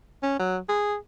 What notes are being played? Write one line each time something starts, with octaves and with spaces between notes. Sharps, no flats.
C#4
F#3
G#4